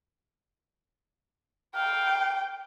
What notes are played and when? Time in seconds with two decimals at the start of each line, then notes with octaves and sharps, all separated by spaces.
1.76 F5 G5